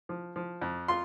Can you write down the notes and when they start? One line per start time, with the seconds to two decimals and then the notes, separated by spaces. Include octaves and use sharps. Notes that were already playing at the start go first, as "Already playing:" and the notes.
0.09 F3
0.36 F3
0.62 F2
0.88 F4 C6